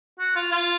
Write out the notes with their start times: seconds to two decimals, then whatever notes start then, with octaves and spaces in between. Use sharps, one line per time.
0.19 F#4
0.36 F4
0.52 F4